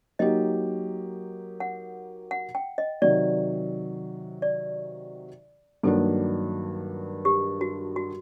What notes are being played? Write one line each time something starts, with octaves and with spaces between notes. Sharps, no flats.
F#3 A#3 D#4 G4 D#5
F#5
F#5
G5
D#5
C3 D#3 F#3 D5
D5
G2 D#3 F#3 A#3 D4 A4
G4
F#4
F#4